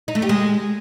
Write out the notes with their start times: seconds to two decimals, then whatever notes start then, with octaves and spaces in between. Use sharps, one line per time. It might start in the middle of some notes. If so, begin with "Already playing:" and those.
0.08 D#4
0.15 A3
0.22 G4
0.29 G#3